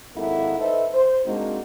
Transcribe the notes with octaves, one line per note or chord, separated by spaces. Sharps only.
G#1 D#2 A#3 E4 A4 F#5
D#4 A4 B4 C5 D#5 E5
C5
G#3 A#3 C4 D4 D#4 F#4